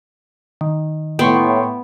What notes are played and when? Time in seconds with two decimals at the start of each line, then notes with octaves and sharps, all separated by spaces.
0.61 D#3
1.19 A2 B3 G5 C6 C#6